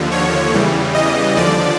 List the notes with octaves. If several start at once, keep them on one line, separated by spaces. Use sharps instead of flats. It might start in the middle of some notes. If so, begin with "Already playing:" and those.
Already playing: D#2 D3 F3
C#5
E2 C#3 E3 G3
D#5
D#2 D3 F3 D5